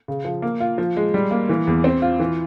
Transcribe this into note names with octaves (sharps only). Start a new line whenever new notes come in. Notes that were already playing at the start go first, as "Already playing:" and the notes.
C#3
F3
A#3
F4
F3
G#3
G3
A#3
E3
E2
C4
F4
E3